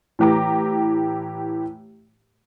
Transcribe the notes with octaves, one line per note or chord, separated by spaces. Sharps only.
A2 E3 G4 A#5 D6